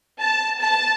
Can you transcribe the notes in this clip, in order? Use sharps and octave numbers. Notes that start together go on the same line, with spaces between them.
A5
A5